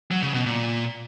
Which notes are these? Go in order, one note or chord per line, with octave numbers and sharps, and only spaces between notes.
F#3
C#3
B2
A#2